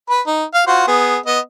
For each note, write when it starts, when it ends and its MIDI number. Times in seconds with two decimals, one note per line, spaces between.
0.10 0.21 71
0.10 0.21 83
0.27 0.44 63
0.54 0.63 77
0.67 0.86 65
0.67 0.86 66
0.67 0.86 72
0.87 1.17 59
0.87 1.17 68
1.26 1.39 59
1.26 1.39 75